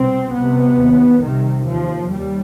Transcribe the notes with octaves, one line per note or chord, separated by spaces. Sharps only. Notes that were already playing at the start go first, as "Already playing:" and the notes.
Already playing: C2 B2 C4
C2 C3 B3
D#2
C2 C3 D#3
D#2 F3
D#2 G3